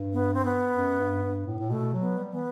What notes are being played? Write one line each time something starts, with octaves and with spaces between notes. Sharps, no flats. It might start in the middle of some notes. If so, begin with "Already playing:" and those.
Already playing: G2
B3
C4
B3
F#2
G2
G2
A2
A2
B2 A3
F#3
B3
G3
E3 B3